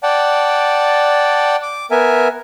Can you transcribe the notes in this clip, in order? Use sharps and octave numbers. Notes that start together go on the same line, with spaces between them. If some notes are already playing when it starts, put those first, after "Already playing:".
D5 F#5 G5 A5
D6
B3 A#4 E5 G#5